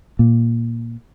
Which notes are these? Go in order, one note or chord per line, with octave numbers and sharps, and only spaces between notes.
A#2